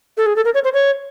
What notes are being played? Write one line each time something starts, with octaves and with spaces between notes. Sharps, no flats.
A4
G#4
A4
A#4
C#5
C5
C#5